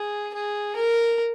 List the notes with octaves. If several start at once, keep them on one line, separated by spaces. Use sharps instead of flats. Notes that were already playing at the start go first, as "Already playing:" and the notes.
Already playing: G#4
G#4
A#4